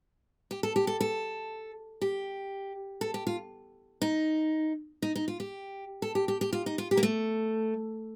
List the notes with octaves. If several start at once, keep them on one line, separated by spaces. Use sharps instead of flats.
G4
A4
G4
A4
A4
G4
A4
G4
F4
D#4
D#4
D#4
F4
G4
A4
G4
G4
G4
F4
D#4
F4
G4
A#3
A3